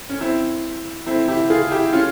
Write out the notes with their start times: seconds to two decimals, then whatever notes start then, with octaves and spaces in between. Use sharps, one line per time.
0.10 C#4
0.21 C4 E4
1.06 C4 E4
1.28 E4 G4
1.50 F4 G#4
1.71 E4 G4
1.93 C#4 F4